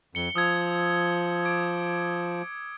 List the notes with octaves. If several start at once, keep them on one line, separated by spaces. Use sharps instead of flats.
F2 C#7 G7
F3 D#6 E6 G#6
D6 G#6 D7